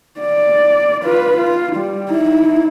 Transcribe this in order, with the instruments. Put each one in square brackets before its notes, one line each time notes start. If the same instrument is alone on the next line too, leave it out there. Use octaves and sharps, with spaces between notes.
[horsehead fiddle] D5
F4 B4
F4
G3
D#4 E4